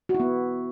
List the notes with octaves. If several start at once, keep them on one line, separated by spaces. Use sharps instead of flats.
F#4
E4
B3